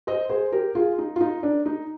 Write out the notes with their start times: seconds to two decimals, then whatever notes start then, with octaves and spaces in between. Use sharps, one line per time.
0.07 C5 D#5
0.29 G#4 C5
0.52 G4 A#4
0.75 F4 G#4
0.98 D#4
1.16 F4
1.21 D#4
1.43 D4
1.66 D#4